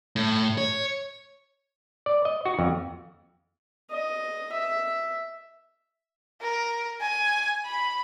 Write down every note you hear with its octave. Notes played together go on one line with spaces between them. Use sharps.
A2
C#5
D5
D#5
F#4
F2
D#5
E5
A#4
G#5
B5